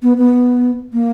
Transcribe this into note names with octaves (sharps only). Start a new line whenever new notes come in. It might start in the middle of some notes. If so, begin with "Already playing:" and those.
B3
B3
A#3